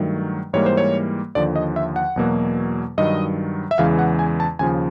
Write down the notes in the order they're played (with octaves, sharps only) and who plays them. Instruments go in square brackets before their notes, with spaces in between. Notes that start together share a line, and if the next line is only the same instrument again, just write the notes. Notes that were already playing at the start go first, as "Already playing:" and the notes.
Already playing: [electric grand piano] G2 D#3 F#3 A3
G#2 E3 G3 A#3 C#5
C5
C#5
D#2 D3 F3 D5
D#5
E5
F#5
E2 B2 F#3 A#3
G2 D#3 F#3 D#5
E5
E2 C#3 E3 G#3 F5
F#5
G#5
A5
D#2 C#3 F3 G#5